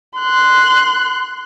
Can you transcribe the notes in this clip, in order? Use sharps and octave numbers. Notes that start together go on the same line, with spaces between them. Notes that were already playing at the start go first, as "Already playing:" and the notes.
C6 F#6